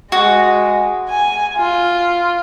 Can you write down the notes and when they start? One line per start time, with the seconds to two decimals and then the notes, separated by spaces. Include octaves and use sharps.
0.12 G#3 F#4
1.09 G#5
1.57 F4